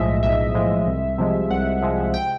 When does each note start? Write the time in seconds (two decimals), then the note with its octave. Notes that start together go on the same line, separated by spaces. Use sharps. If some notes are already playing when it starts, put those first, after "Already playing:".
Already playing: B1 A2 F3 G#3 D#5 E5
0.23 B1 E5
0.55 A2 F3 G#3
0.87 C2
1.18 C3 F3 G#3
1.51 C2 F#5
1.82 C3 F3 G#3
2.14 G5